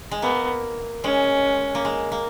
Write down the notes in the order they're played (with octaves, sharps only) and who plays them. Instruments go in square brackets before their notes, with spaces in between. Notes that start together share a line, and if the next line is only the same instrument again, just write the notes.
[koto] G#3
[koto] A#3 [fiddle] B3
[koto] G#3 [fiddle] C#4
[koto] A#3
G#3
A#3